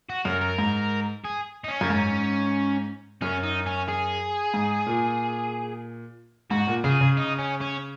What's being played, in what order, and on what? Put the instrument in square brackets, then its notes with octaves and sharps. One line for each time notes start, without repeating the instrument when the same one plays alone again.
[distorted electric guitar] F#4
[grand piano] F#2 [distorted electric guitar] A#4
[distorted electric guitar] A#4
[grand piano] G#2
[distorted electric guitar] G#4
D#4
C#4
[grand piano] F#2
G#2
[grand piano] F#2 [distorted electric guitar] C#4
[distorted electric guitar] D#4
C#4
G#4
[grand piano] G#2
A#2
[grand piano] G#2 [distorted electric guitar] F#4
[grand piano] A#2
[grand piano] C#3 [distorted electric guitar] G#4
[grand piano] C#3
[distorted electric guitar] D#4
C#4
C#4